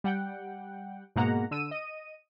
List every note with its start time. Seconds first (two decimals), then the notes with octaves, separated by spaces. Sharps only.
0.04 G3 F#5 G5
1.16 G#2 B2 G#3 A#3 F#5 A#5
1.51 D3 E6 D#7
1.71 D#5 D#7